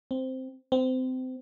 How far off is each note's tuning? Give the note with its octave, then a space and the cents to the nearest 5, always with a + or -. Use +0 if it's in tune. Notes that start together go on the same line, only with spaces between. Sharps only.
C4 -5
C4 -25